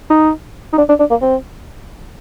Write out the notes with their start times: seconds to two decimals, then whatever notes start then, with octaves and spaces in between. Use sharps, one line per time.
0.10 D#4
0.73 D#4
0.78 D4
0.89 D4
0.99 D4
1.10 A#3
1.22 C4